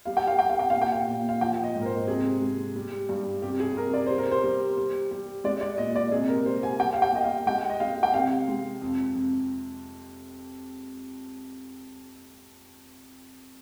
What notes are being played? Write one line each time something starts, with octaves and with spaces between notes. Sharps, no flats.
G3 F5
G5
F5
G3 G5
F5
G5
A#2 F5
G5
F5
A#2
F5
F3 G5
D#5
G#2
A#4
C5
C3 G#4
G#3
G3
G2
C3 G4
G#4
C3 A#4
D5
G3 C5
A#4
C5
G3
G3
G3
G#3 D5
D5
A#2 D#5
D5
C3 G#4
A#4
G3 C5
G#5
G3 G5
F5
G5
G3 D#5
F5
G#3 G5
D#5
G#3 F5
G5
C3 F5
G#3
F2
F2